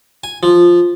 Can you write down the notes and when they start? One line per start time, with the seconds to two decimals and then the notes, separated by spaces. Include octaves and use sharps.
0.24 G#5
0.43 F3